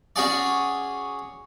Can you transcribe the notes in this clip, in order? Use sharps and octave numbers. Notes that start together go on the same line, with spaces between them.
C#4 F#4 G#4 D5